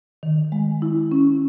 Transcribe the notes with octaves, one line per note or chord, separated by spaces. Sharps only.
D#3
G#3
E4
C#4